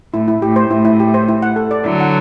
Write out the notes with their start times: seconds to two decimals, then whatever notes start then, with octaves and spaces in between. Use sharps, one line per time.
0.13 A2 E4
0.28 E4
0.42 A2 G4
0.56 C5
0.70 A2 E4
0.85 E4
1.00 G4
1.14 C5
1.28 E4
1.43 F#5
1.56 A4
1.71 D5
1.85 D3 F#3 E4
2.00 F#5